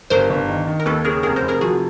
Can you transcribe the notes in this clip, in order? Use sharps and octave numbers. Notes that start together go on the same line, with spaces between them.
G1 A#4 C5
G1
D#3
D#3
A#4
D#2 A4 B4
C#3 G#4 A#4
F1 G#4 A#4
A#4 C5
F1
G#4 A#4
F3 F#4 G#4